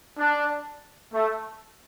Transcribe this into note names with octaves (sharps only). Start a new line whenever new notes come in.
D4
A3